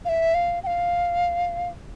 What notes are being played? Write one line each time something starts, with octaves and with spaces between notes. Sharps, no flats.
F5
E5
F5
G5
F5